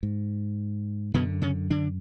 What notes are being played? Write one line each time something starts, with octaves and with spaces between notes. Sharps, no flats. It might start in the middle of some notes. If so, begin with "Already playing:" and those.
G#2
F#2 B2 D3 B3
C#3 C#4
D3 D4